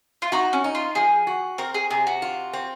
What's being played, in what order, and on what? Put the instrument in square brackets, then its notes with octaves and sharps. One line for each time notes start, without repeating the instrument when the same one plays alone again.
[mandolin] F4
[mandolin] D#4 [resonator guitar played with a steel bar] F#4
[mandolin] C#4
[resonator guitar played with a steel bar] D#4
[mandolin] F4
[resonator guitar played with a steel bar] F3 [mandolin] G#4
[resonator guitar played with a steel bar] F#4
[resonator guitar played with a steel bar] C4 [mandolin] A#4
[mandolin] G#4
[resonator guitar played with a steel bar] C3 [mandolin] G#4
[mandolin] F#4
[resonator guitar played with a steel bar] F4
C4